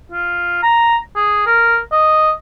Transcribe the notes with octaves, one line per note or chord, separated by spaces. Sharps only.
F4
A#5
G#4
A#4
D#5